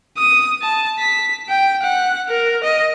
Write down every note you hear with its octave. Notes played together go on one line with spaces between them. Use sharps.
D#6
A5
B6
G5
F#5
A#4
D#5